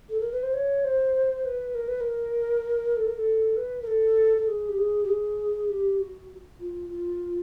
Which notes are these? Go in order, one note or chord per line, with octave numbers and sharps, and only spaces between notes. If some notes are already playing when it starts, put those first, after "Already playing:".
A4
A#4
B4
C5
C#5
C5
B4
A#4
B4
A#4
A4
A#4
A4
B4
A#4
A4
A4
G#4
G4
G#4
G4
G#4
G4
F#4
F4
F4